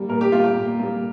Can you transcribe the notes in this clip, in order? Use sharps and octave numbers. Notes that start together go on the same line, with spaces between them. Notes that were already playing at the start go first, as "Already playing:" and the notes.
Already playing: G3 A#3
A#2 A#4
G4
G3 A#3 F4
G4
A#2
G3 A#3